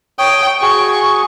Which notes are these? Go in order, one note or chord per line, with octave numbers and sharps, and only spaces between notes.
C#5 G5 D#6
F#4 G#4 C#6